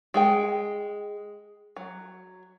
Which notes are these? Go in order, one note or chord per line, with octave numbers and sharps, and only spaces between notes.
G#3 G#4 G5
F#3